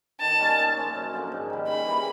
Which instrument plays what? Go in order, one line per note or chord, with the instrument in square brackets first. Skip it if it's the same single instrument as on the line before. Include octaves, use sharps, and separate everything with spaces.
[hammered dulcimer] D#3 [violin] A5
[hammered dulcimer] G3 A#3 C#4
A#2
F3 A#3 C#4
F#2
D3 F3 A#3
G#2
D#3 G3
[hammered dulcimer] C#3 [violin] B5
[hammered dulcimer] E3 G3 A#3